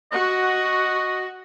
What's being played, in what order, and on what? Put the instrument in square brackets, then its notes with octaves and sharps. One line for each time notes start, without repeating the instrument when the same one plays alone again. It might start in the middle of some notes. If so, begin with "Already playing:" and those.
[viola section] F#4 [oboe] D#5